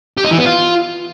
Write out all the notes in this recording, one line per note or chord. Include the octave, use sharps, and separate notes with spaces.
G4
D#4
E3
B3
F4